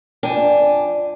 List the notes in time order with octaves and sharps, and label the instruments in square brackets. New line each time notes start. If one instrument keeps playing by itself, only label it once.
[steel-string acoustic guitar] F2 D4 G5 G#5